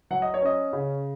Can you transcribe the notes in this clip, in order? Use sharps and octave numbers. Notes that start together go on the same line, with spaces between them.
F#3 F#5
D#5
C#5
C#4 D#5
C#3